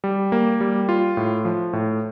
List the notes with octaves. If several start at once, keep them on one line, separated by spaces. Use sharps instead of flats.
G3
A#3
G3
F4
A2
F3
A2